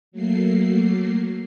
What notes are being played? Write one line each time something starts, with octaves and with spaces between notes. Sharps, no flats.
F#3 A3 A#3 C7